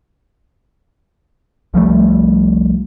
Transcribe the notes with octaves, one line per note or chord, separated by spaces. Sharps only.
C2 F3 G3 A3